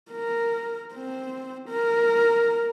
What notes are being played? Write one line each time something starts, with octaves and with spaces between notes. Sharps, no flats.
A#4
C4
A#4